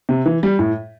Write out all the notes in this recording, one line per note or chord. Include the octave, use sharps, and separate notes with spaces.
C3
E3
G3
A2